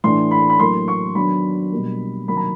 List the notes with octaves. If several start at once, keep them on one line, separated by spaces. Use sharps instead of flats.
A2 E3 A3 D4 C6
B5
B5
A2 F#3 A#3 C6
C#6
D#3 F#3 B3 D4 B5
B2 G3 A#3
C3 D#3 F#3 A#3 B5
A#5